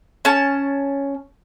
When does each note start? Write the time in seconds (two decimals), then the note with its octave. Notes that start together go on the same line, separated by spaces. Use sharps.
0.25 C#4 A5